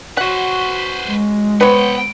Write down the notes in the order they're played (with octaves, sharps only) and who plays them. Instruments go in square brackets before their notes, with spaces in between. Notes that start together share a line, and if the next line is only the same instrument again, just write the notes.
[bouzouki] C#4 F#4 [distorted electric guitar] B4 C5 [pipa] F#5
[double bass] G#3
[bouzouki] B3 C4 [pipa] B4 C#5 [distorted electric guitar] F#5 G5